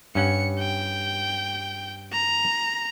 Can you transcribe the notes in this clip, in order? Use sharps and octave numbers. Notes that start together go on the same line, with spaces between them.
G2 C#4 F#5 C#7
G5
A#5